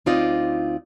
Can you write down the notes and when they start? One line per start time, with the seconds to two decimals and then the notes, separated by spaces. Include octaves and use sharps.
0.06 D2 C4 D#4 F4 D5 D#5